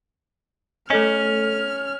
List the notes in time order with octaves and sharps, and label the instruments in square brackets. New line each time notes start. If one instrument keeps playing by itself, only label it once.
[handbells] A3 A4 D#5 [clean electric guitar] C#4 [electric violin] F6